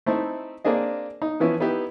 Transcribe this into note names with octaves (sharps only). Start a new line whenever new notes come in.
A3 C4 D#4 E4
A#3 C4 D4 G#4 D#5
D#4
E3 F3 B3 C#4 E4
B3 D#4 E4 G4 B4